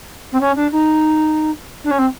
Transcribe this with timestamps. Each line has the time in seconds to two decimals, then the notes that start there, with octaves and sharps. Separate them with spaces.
0.32 C4
0.40 C#4
0.56 D4
0.72 D#4
1.84 D4
1.91 C#4
1.98 C4